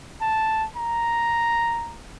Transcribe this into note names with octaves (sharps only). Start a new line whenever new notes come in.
A5
A#5